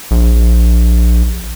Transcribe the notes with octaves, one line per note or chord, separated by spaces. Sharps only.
A#1